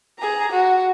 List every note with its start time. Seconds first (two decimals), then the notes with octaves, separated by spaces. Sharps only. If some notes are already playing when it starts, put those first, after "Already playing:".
0.19 G#4 A#5
0.53 F#4